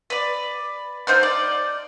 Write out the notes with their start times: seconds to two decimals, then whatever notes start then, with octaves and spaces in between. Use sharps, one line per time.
0.10 B4 D5
1.07 A3 D#4 C5 F6
1.23 D5